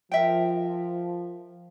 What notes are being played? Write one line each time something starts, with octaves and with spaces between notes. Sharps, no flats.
F3 A#4 E5 G5